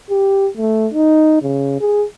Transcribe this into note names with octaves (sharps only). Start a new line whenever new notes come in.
G4
A3
D#4
C#3
G#4